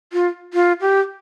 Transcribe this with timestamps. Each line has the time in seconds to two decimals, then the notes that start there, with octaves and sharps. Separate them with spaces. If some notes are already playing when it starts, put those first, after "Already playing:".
0.13 F4
0.54 F4
0.81 G4